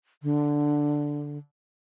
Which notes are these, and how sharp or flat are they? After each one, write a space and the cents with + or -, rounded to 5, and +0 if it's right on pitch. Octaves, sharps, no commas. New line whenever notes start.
D3 +0